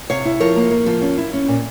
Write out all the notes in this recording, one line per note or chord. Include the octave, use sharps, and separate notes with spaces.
C3 C#5 F5
E4
F3 A#4 C#5
A#3
A#3
F3
C#4
E4
C#4
A#2